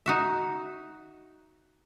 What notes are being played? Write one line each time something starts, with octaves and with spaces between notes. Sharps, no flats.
D#4 F#4 E5